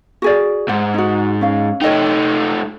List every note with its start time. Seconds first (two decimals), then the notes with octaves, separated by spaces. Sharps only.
0.22 F#4 G#4 D5
0.69 G#2 F#5
0.94 D#4 F#4
1.41 C#4 F5
1.82 A3 D#4 C#5 D#5 G5